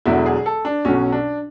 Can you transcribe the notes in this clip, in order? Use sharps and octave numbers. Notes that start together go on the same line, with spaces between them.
E1 E2 D3 F#3 E4
G#4
A4
D4
B1 B2 F#3 C#4
D4